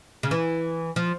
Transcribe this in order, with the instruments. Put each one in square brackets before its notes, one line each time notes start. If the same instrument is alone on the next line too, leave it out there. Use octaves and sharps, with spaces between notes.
[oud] C#3
E3
F3